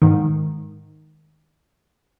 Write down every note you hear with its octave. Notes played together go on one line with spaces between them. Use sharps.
G#2 D#3